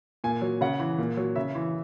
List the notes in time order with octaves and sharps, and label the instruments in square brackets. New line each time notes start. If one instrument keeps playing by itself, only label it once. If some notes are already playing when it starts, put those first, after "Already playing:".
[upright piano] A#2 G#5
F#3
C#3 F#5
E3
A#2
F#3
C#3 E5
E3